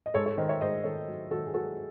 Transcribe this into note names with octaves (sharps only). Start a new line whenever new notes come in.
D#5
G#2 A4 C#5
A4 C#5
D#3 C5 D#5
C#5 E5
G#2 C5 D#5
D#3 A4 C#5
F#3
D#3 F#4 A4
G#4
F#3 F#4 A4